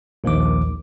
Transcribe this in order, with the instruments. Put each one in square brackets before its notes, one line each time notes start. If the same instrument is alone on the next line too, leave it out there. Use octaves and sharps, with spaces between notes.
[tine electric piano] A#1 D#2 D#3 D6